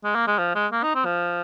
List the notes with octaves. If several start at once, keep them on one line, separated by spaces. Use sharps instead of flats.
G#3
A#3
G#3
F3
G#3
A#3
D#4
C4
F3